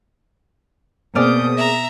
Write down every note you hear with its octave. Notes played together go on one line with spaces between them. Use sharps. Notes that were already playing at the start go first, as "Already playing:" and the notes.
B2 A#3 C4 G#4 D5 D#6 F6 G6
E5 A#5 A#6